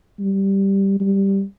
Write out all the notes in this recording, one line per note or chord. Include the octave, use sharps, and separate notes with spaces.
G3
G3